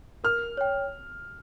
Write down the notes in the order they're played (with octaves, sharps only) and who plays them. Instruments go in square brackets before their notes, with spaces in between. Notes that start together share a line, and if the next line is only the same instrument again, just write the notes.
[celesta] A#4 [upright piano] F6
[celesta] C#5 G5